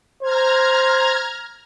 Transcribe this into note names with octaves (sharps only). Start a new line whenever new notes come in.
C5 A#5 F6 G#6